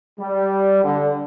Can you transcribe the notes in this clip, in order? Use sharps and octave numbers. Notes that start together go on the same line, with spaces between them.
G3
D3